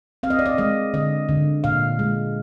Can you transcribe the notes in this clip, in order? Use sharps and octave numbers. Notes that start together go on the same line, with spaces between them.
C4 F5
D#5
D5
D#5
G#3 D#5
D3 D#5
D3
A#2 F5
G#3